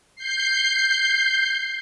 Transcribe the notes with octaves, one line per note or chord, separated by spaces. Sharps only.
G6 C7